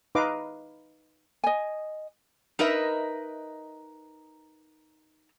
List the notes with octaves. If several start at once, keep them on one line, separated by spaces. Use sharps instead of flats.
D#4 B4 D#5 F5 D6
D#5 G#5
D#4 A#4 B4 D#5 E5